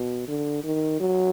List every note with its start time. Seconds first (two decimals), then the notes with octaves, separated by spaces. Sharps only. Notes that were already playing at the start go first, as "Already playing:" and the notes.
Already playing: B2
0.28 D3
0.64 D#3
1.00 F#3